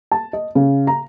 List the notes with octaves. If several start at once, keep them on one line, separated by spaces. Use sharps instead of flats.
A5
D#5
C#3
A#5